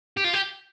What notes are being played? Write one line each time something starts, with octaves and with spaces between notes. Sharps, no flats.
G4
F4
G4